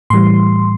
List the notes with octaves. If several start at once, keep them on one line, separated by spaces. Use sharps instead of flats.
A2 E3 G3 C6